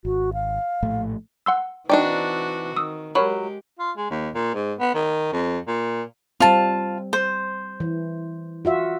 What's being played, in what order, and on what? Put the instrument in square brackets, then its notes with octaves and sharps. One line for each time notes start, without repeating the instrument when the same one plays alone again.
[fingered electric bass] G#1 [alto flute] F#4
[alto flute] F5
[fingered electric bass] A#1 A2 A3
[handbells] F#5 C6 E6
[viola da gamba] E3 C4 F#4 [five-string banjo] D4 D#4 D5 [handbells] G5
[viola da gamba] D#3 [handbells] D#6 E6
[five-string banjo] F#3 [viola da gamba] G#3 G4 [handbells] A#4 C#5 B5
[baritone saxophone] F4
G#3
D#2
A#2
G#2
B3
D#3
F2
A#2
[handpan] G3 C4 [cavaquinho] F4 A5
[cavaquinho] C5
[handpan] E3
F4 F#4 E5